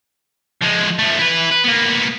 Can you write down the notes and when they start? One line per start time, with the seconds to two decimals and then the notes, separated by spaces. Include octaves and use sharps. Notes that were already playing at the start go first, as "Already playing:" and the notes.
0.62 F3 G#3
0.99 F3 A3
1.19 E4 B4
1.51 B4
1.64 A#3 B3